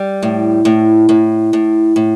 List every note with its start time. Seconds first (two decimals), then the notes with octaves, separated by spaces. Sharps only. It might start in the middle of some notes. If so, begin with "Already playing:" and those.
Already playing: G3
0.23 A2
0.65 A2
1.09 A2
1.53 A2
1.96 A2